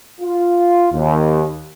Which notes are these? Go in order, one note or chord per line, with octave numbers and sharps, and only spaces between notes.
F4
D#2